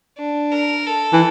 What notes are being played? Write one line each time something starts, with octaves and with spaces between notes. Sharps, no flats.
D4
A#4
A4
E3